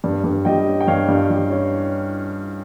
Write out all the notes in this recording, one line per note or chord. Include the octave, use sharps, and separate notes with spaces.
G2
G2
G3 D#5 G5
C#4
G5
G2 C#5 F5
G2
G3
C#4